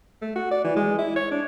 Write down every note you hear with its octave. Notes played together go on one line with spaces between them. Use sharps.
A3
F#4
D5
E3
G#3
E4
C#5
D4